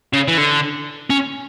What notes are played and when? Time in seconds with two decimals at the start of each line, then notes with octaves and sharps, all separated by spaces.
0.13 C#3
0.28 E3
0.38 D3
1.10 C#4